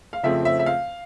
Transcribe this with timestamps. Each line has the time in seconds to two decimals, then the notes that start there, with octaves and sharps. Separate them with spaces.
0.13 F5
0.23 F2 C#3 F3 A3 C4 E5
0.45 E5
0.59 E5
0.66 F5